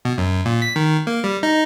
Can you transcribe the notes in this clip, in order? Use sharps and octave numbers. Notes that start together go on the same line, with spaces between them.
B2
F#2
A#2
B6
D#3
A#3
G3
D#4